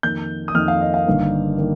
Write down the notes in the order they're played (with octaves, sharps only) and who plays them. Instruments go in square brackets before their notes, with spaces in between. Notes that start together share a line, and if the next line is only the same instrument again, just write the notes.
[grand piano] F2 D#3 A#3 G6
D#6
F2 D#3 A#3 F6
F5
D#5
F5
G1 G2 D#3 A#3
D#3 A#3